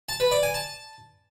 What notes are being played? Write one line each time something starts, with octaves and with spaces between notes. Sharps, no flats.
A5
B4
D5
G#5
A5